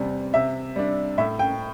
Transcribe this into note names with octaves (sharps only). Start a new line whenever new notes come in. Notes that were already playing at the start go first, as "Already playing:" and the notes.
Already playing: E2 C3 G3
C3 E5
G3 D4
A2 E5
G5